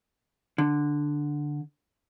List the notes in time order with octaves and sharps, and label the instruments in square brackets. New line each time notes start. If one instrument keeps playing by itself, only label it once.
[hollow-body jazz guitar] D3